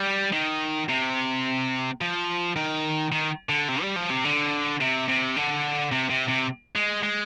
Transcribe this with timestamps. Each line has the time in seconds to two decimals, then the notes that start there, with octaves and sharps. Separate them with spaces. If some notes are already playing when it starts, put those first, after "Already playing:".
Already playing: G3
0.33 D#3
0.89 C3
2.01 F3
2.56 D#3
3.12 D#3
3.49 D3
3.68 C3
3.82 G3
3.96 F3
4.10 C3
4.25 D3
4.80 C3
5.08 C3
5.36 D3
5.92 C3
6.10 C3
6.28 C3
6.76 G#3
7.03 G#3